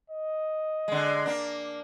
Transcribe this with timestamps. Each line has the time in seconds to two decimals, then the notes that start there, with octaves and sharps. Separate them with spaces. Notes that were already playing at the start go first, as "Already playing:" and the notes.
0.10 D#5
0.88 D3 G#3
1.26 A#3 D4